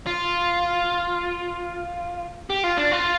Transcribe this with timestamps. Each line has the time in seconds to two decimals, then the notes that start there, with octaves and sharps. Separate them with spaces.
0.06 F4
2.50 G4
2.64 F4
2.78 D4
2.92 F4